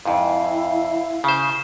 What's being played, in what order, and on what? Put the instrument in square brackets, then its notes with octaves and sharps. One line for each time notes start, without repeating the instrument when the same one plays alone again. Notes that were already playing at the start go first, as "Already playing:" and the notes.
[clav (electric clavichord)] F2 G#2 [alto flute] E4 [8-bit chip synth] F5
[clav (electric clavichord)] C#3 C5